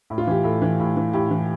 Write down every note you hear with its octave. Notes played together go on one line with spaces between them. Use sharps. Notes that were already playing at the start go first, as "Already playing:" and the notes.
A2
F4
E3 G4
A2 A4
E3
A2
E3
A2 G4
E3